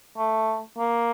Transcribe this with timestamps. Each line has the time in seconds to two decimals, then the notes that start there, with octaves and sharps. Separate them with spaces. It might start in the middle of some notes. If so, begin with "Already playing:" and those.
0.17 A3
0.78 A#3